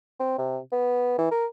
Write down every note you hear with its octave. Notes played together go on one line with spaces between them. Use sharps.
C4
C3
B3
E3
A#4